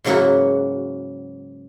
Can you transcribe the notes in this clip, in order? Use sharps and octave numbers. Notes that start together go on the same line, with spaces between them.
G#2 C#3 F#3 A#3 E4 F#4